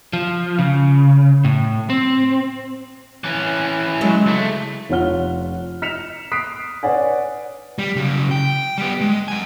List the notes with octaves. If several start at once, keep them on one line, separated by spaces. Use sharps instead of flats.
F3
C#3
A2
C4
E3 C#4
F#3 G#3
C#2 A3
F1 F4 C#5 F#5 F6 G7
F6 B6 C#7 E7 F7
D#6 F#6 B6 C7 D7
B4 C#5 D5 F#5 G#5
G3
C#3 F#3
G5
G3 B3
G#3
F#5 G#5